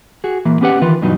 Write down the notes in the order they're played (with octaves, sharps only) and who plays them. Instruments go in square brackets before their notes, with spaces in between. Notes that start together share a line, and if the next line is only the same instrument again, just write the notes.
[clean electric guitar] F#4 G#4
A#2 E3 A#3
B3 C#4 G4 B4 F#5
D#3 E3 F4 B4
G2 B2 E3 F#3 D#4